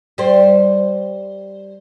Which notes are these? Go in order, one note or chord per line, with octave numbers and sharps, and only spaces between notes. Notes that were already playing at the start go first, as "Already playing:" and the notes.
G3 C5